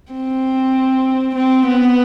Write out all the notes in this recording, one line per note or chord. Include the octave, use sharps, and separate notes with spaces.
C4
C4
B3